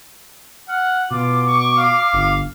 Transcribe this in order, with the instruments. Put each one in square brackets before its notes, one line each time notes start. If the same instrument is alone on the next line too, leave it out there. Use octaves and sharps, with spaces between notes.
[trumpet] F#5 [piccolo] F6
[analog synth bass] B2 [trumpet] F4 [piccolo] D6
[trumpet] C#6
F5
[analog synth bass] G1